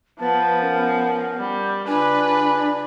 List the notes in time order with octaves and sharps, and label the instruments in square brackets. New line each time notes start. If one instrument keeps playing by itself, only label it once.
[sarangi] F3 [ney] B3 [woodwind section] B4 A5
[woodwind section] C#4 A#4
[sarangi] G3
[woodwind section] C#3 F4 G#5 [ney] D4 [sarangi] B4